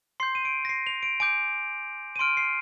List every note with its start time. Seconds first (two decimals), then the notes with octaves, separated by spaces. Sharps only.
0.20 C6 G6 C7
0.35 D#7
0.45 D7
0.65 A#6
0.69 C7
0.87 F7
1.03 D7
1.20 G#5 D6 G6 D7
2.16 D#7
2.19 C6 F6 D7
2.37 C7